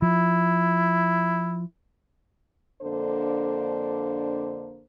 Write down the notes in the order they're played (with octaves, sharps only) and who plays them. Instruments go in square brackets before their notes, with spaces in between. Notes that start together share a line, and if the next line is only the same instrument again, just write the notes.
[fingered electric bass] F3 [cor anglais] E4
[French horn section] F2 D3 A#3 D4 A4 C5